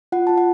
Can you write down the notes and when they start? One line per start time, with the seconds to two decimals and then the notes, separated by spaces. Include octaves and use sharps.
0.12 F4 F#5
0.27 F4 A5
0.38 F#5